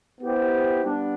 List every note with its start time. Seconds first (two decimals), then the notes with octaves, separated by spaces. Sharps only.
0.20 B3 E4 G4 C5
0.85 G3 B3 D4